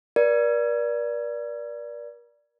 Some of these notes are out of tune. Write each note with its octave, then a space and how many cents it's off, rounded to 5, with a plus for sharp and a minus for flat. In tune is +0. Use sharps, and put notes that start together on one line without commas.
A#4 +40 D5 -5